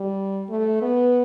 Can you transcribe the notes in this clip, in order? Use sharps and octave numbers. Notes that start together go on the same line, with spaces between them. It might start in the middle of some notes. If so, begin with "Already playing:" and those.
Already playing: G3
A3
B3